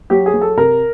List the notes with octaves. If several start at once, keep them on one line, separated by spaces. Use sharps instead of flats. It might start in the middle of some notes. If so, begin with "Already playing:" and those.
F#3 G4
G#4
F#3
A4
C3 A#4